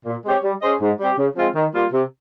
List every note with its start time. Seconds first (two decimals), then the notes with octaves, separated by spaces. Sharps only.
0.06 A#2
0.25 G#3 C4 G4 C#5
0.43 G3
0.62 C#4 G#4 C5 D#5
0.80 G#2
0.99 G3 C4 G4
1.17 C#3
1.36 F3 G#3 C4 F4
1.55 D#3
1.73 G3 A#3 F4
1.93 C3